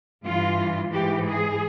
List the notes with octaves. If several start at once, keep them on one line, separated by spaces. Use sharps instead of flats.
G2 E3 F4
G#2 E3 G4
G#4